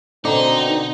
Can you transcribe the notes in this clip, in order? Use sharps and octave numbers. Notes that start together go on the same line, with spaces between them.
B2 D3 C4 D#4 A#5 D6